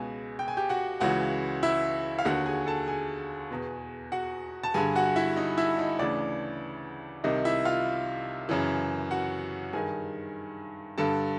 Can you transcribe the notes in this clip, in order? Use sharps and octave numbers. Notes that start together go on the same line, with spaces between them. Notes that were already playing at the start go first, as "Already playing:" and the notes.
Already playing: C#2 B2 G#4 G#5
G5
G#5
G4 G5
F#4 F#5
C#2 C#3 E3 F#4 F#5
E4 E5
F5
D#2 D3 F#4 F#5
G#4 G#5
A4 A5
G#4 G#5
E2 B2
F#4 F#5
A5
G2 D3 G#4 G#5
F#4 F#5
E4 E5
D#4 D#5
E4 E5
D#4 D#5
D2 C#3 E3 D4 D5
C2 C3 D#3 D#4 D#5
E4 E5
F4 F5
F#2 C#3 E3
F#4 F#5
G2 D#3 G#4 G#5
G2 D3 A4 A5